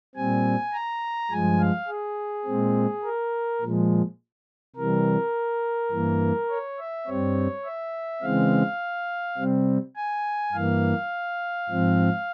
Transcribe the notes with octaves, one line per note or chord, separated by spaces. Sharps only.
A#2 G3 C4 G#5
A#5
G2 F3 G#3 G#5
F5
G#4
A#2 G#3 C4
A#4
A#2 F3 G#3
C3 E3 G3 A#4
G2 E3 A#3
C#5
E5
G2 G3 C4 C#5
E5
C#3 E3 G#3 C4 F5
C3 G3 C4
G#5
G2 E3 A#3 F5
G#2 F3 C4